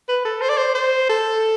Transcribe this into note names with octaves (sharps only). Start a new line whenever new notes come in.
B4
A4
C5
D5
C5
C5
A4